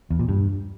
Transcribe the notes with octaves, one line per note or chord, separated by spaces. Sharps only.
E2
A#2
G2